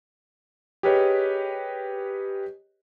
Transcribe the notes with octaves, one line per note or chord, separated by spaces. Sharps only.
G4 G#4 A#4 B4 C#5 D#5